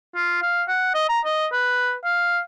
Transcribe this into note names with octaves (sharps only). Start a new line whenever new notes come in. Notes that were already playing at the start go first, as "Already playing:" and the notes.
F4
F5
F#5
D#5
A#5
D#5
B4
F5